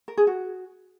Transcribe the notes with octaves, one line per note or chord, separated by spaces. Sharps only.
A#4
G#4
F#4